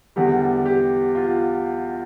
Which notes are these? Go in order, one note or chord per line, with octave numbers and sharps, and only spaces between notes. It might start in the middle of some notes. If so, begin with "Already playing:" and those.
E2 D3 G3 G4
G4
F4